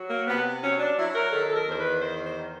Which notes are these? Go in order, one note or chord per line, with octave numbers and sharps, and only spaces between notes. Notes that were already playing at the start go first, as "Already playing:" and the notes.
Already playing: F#3
A#3
C3 B3
F#3 C#4
D4
F#3 E4
A#4
D#3 A4
A4
A#4
E2 C5
B4
D#3 C5
C5
D#3